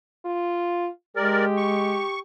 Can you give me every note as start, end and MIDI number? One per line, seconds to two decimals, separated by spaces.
0.25 0.88 65
1.16 2.02 56
1.16 2.21 67
1.16 1.45 70
1.16 1.45 74
1.57 2.19 85